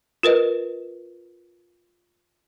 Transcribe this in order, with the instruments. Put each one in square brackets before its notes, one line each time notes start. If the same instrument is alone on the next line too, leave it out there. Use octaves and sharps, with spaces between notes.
[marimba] F4 A#4 B4 D#5